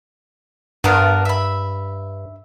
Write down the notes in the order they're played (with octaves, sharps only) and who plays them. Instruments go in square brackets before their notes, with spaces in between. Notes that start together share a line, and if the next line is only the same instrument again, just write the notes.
[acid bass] G2 [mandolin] B3 D4 A#4
[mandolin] E5 B5